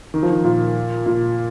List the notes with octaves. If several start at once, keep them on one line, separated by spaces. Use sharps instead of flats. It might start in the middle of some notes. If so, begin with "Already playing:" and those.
D#3
F3
D#3
A#2
A#2